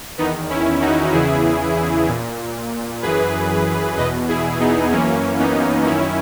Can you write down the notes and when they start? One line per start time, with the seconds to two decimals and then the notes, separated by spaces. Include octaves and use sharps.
0.18 E2 D#3 B3 D#4
0.49 C#4 E4
0.81 D#4 F#4
1.12 E2 C#3 E3 E4 G#4
2.08 A#2
3.02 F#2 E3 G#4 B4
3.97 E2 B2 B4 D#5
4.28 E4 G#4
4.60 B3 D#4
4.92 F#2 E3 A#3 C#4
5.39 B3 D#4
5.86 F#2 D#3 C#4 E4